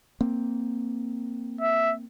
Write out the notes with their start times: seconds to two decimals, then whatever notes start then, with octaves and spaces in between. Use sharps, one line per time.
0.21 A#3 C4
1.61 E5